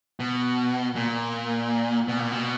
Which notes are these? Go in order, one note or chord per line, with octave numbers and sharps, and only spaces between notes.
B2
A#2
B2
A#2
B2